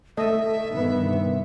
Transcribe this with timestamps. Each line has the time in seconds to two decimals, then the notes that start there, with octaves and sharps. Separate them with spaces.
0.17 A3 A4 D#5 E5
0.70 G2 D#3 B3
1.07 C3